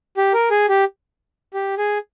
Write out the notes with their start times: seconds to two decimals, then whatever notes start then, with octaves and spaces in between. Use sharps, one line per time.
0.17 G4
0.33 A#4
0.51 G#4
0.69 G4
1.54 G4
1.78 G#4